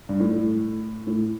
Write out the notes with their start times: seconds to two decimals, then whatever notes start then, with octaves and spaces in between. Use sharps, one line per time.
0.09 G2
0.20 A2
0.31 A2
1.07 A2